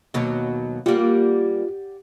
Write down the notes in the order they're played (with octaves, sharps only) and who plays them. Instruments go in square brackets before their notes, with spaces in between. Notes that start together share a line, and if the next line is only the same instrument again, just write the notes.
[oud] D#2 B2 F#3
[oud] G3 A#3 [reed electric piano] F4 [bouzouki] G4 D5 F#5